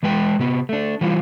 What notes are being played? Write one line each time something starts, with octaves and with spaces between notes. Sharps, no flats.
E3 G#3 B4 G5
C3 B3
A3 D4
E3 G3 F4